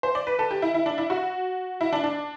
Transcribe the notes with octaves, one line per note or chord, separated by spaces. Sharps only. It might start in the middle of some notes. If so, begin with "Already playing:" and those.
C5
D5
B4
A4
G4
E4
E4
D4
E4
F#4
E4
D4
D4